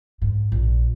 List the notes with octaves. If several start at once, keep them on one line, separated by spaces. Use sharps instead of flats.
G#2
A#1